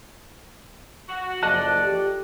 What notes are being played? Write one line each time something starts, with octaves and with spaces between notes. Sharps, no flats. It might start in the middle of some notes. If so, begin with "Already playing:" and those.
F#4
F#1 F3 A4 D5 D#5 A5 F#6
G4